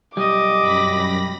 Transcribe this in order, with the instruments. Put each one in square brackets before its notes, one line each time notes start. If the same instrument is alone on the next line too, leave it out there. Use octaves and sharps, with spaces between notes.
[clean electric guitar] B1 G3 [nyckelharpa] D#5 [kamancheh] D6
[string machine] F#2 B5 A#6